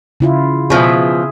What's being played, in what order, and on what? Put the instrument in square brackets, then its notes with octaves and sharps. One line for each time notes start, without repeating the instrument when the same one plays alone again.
[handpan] C#3 E4 F4
[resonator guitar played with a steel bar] B2 F3 [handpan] G#4 E5